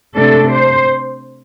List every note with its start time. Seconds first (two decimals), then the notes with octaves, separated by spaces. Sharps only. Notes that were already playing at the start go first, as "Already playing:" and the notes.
0.15 C3 A3 D4 A4
0.51 C5